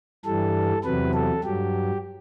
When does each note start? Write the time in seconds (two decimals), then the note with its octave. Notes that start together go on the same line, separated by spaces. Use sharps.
0.25 G2 E3 G3 A4
0.84 E2 C3 F#3 B4
1.14 A4
1.44 G2 F#3 G4